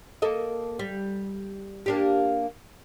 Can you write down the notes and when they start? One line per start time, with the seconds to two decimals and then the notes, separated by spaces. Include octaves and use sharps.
0.22 A#3 A4 D#5
0.79 G3
1.86 A#3 D4 G4